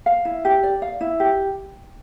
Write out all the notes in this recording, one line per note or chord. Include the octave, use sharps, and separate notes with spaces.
F5
E4
G4
D5
F5
E4
G4